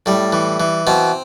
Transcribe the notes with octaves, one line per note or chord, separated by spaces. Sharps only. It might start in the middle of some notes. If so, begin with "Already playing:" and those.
A2 G3
E3
E3
B2 C4